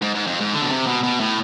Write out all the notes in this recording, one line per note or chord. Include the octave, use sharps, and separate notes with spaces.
G#2
G#2
F2
G#2
D3
B2
C3
B2
B2
A2